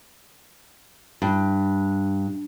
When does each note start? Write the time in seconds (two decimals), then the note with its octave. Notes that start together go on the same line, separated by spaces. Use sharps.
1.22 G2